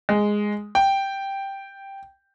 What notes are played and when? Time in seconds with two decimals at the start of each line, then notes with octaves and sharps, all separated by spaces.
0.09 G#3
0.75 G5